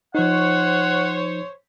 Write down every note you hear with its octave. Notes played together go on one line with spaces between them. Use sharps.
F3 D#4 C5 C#5 F#5